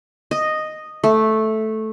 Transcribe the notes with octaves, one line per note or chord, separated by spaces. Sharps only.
D#5
A3